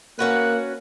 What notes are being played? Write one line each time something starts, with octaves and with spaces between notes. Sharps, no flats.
A#3 C#4 F#4 B4 F#6